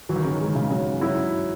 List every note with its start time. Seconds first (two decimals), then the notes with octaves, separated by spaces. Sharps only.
0.09 E3 F#3
0.16 D#3
0.24 C#3
0.31 D#3
0.40 G#3
0.55 C#3
0.71 F#3
1.01 F#3 E4